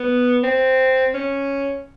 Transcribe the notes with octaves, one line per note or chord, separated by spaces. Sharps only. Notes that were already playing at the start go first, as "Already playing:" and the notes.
Already playing: B3
C4
C#4